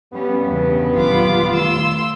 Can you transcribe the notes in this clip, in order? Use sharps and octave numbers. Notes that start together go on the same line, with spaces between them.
G2 G3 B3 C#4
E2 C#3
D#1 F#3 G3 F4 B5 D6
D#3 A3 C6 E6